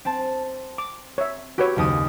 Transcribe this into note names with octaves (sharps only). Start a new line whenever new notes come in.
C4 A5
D6
C#5 E5
F#4 G4 B4 C#5
F#1 D#2 D#6